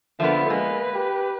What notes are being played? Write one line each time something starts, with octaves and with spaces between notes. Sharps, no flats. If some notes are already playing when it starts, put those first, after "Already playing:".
D3 F3 A#3 B3 E5
G#3 A#3 B4
G4